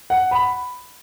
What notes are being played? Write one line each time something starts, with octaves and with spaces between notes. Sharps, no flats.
F#5
B5